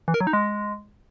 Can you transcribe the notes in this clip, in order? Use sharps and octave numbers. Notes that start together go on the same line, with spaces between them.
E3
A#4
F#3
D#4
G#3